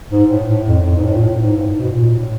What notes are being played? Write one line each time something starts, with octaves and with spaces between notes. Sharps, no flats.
G#2
A2
A2
F2
F2
G#2
A2
A#2
A2
G#2
G2
G#2
B2
A#2
A#2
A2